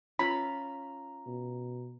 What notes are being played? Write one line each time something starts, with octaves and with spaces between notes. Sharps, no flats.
C#4 F4 A#5 B5
B2